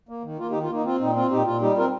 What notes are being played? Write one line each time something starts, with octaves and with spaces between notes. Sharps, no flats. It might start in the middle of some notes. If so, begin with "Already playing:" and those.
A#3
D#3
A#3 F4
D#4 G4
D#3
F4
A#3 D#4
C4 F4
A#2 D#4
C4 F4
A#2 D#4 G4
A#2 F4
G3 D#4 G4
C4 F4 A#4